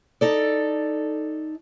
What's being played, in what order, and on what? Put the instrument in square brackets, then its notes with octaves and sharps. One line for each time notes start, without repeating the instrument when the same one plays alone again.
[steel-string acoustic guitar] D#4 A4 D5